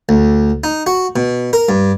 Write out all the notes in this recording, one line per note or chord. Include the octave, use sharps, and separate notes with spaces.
D2
D#4
F#4
B2
A#4
G2